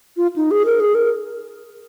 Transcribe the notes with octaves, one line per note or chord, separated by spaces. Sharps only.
F4
D#4
G#4
A#4
G#4
A#4